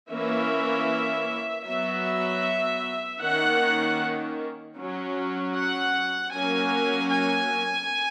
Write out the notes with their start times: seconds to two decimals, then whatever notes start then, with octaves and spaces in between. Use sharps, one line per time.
0.10 E3 A#3 C#4 E5
1.66 F#3 B3 E5
3.22 D#3 A#3 C#4 F#5
4.78 F#3 C#4
5.56 F#5
6.34 F#3 A#3 C#4 G#5
7.12 G#5